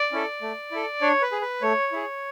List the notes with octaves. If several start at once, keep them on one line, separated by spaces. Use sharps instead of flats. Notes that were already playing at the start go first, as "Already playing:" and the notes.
Already playing: D5
C#4 E4 A4
A3
E4 A4
D4 C#5
B4
G#4
B4
A3 C#5
E4 G#4